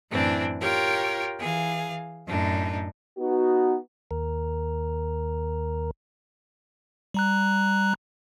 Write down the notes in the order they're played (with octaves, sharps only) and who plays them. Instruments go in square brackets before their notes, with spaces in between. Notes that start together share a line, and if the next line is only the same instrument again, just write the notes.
[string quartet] F#2 A2 E3 C4 D4
F4 G4 A#4 C#5 G5
E3 G#4 F5
F#2 A2 D4 D#4
[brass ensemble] B3 D#4 F#4
[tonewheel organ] D#2 A#4
[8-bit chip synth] G3 A#5 F#6